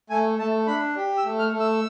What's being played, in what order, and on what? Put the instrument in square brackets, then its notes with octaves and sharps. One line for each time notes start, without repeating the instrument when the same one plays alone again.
[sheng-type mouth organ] A3 G#5
A3 A5
D4 B5
G4
E6
A3
F6
A3
E6